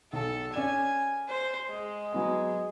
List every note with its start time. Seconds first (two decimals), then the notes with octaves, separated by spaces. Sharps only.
0.13 B1 A4
0.54 C#4 D5 G#5 E7
1.29 C5
1.70 G#3
2.13 F#3 B3 G#5